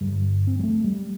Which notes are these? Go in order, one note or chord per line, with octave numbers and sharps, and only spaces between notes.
G1 G2 D3 G3
C4
G3
A3
G3